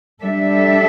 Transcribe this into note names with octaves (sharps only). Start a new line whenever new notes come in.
G3 D4 A4 E5